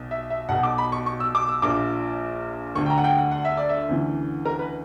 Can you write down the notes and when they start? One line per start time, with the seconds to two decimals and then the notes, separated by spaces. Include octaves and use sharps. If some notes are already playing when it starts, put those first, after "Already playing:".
Already playing: B1 B2
0.11 E5
0.30 E5
0.49 B1 B2 F#5
0.63 D6
0.78 B5
0.92 C#6
1.06 C#6
1.20 E6
1.35 D6
1.49 E6
1.62 A#1 A#2 D6
2.75 D2 D3 C#6
2.86 G5
2.90 A#5
2.98 F#5
3.04 G5
3.18 F#5
3.31 F#5
3.45 E5
3.57 D5
3.69 E5
3.89 D2 C#3 E3
4.45 A#4
4.59 B4